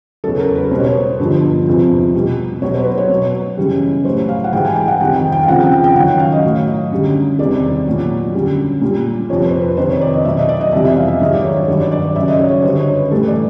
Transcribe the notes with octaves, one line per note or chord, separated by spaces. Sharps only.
E2 C#3 F#3 A4
A4
A#4
B4
B2 G3 C5
C#5
C5
G2 D3 F3
E2 C3 F3
B2 G3
B2 F#3 C#5
C5
B4
C5
C#5
B2 F#3
F#2 C#3 E3 G3
A2 F#3 C5
F5
F#5
G#2 E3 G3 G5
G#5
G5
F#5
F2 C3 D#3 G3 G5
G5
G5
F5
F2 C#3 F3 F#5
G5
G5
G5
F#2 D#3 F#3 F#5
G5
F5
D#5
A2 F#3
F#2 D3 G3
E2 C3 D#3 G3 D5
A#2 F#3
F#2 D3 G3
A#2 G3
F2 C3 F3 C#5
C5
B4
F2 C3 D#3 C5
C#5
D5
D#5
B2 F#3 E5
D#5
D5
D#5
F2 C3 E3 G3 E5
E5
F5
E5
G#2 D#3 F#3 D#5
D5
C#5
C#5
G2 D#3 F#3 C#5
D5
D5
D5
F#2 C#3 F#3 E5
D#5
C#5
C#5
F#2 D3 G3 C5
C#5
B4
A2 E3 G3 A4
D5